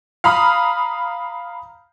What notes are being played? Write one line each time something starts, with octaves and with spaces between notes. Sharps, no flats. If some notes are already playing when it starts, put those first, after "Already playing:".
F5 A#5 B5 D#6 F6